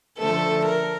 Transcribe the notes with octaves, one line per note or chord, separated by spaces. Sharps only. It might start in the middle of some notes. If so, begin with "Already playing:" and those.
D3 F3 A3 A4
A#4